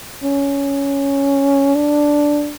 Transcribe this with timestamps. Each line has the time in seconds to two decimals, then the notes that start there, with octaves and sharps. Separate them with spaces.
0.23 C#4
1.75 D4